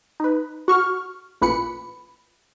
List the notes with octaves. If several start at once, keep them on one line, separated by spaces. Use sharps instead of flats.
D#4 B4
F#4 C#6 F6
A1 A#2 B4 B5 C#7